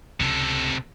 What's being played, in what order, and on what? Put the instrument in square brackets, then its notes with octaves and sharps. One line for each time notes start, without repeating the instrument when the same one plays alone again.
[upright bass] C#2 [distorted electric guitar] C3 A4